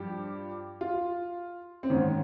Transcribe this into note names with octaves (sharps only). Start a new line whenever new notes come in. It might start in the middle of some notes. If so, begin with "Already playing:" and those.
Already playing: G2 F3 G4
F4
C4
G#2 D#3 C#4